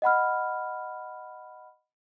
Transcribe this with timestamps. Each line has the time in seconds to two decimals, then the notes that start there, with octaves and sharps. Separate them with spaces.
0.02 D#5 F#5 B5 F6